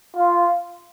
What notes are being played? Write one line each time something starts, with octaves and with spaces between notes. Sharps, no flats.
F4